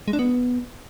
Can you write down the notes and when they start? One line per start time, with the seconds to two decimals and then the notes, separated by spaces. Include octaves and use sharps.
0.08 G#3
0.13 D4
0.19 B3